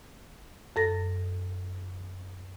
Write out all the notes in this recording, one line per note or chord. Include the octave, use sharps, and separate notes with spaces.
F#2 A4 A#6